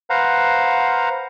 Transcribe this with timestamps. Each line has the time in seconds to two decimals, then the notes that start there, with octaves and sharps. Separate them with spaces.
0.10 B4 C5 F5 F#5 A#5